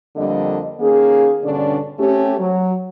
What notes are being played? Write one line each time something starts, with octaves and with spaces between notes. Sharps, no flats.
F2 D3 G3 A#3 D4 D#5
D#3 A#3 C#4 G#4
G2 B2 D3 C#4 D4
A3 C4 C#4 G4
F#3